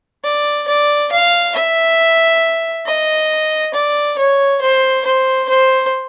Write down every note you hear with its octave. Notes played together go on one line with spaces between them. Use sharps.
D5
D5
F5
E5
D#5
D5
C#5
C5
C5
C5